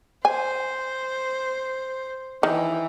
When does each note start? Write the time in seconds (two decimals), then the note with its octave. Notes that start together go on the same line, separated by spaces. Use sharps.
0.25 C5 G#5
2.43 D#3 E3